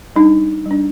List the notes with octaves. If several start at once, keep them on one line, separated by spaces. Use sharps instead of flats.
G3 D4 D#4
G3 D4